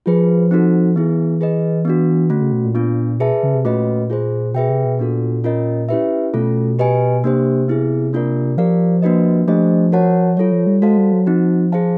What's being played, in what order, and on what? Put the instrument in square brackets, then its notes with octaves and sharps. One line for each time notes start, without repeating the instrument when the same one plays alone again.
[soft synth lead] F3 [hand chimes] F4 G#4 B4
[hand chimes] C4 D#4 F#4 A4
[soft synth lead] E3 [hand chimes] B3 E4 G#4
[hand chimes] G#4 B4 D#5
B3 D4 F#4
[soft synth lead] D3 [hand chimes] A3 C#4 F#4
[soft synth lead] C#3
B2
A#2
[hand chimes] B3 D4 F4
[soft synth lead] B2 [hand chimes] G#4 B4 E5 A5
[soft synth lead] C#3
C3
[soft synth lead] A#2 [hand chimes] A3 C#4 F#4 B4 D#5
[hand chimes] F4 G#4 C5
[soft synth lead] B2 [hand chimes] G#4 B4 E5 G5
[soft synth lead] C3
B2
[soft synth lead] A#2 [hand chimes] B3 D4 F#4 A4
[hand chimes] C#4 F4 A#4 D#5
C#4 E4 G4 B4 E5
[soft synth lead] B2 [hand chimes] A3 C#4 F4 A4
[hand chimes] G4 B4 D#5 G#5
[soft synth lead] C3 [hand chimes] A#3 D4 G4 C5
[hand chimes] B3 E4 G#4
A#3 D4 F4 A#4 D5
[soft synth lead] F3 [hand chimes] G4 A#4 D5 F5
[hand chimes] A#3 D4 F#4 B4 D#5
[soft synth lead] F3 [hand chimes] A3 D4 G4 C5 D#5
[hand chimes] F#4 A#4 C#5 F#5 A5
[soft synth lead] F#3 [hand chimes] F4 A4 C#5
[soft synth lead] F3
G3
[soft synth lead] G#3 [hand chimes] F#4 A4 C5 F5 A5
[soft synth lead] G3
F#3
[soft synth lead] F3 [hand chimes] C4 D#4 F#4
[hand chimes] G#4 C5 F5 A5